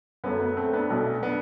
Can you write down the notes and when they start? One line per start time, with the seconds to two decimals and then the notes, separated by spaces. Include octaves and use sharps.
0.24 F#2 F#3 A3 B3
0.40 B3
0.57 A3 C4
0.73 B3 D4
0.90 B1 B2 A3
1.23 B3 D4